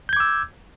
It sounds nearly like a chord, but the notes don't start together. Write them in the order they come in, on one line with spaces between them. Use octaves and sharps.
G6 G#6 D6 E6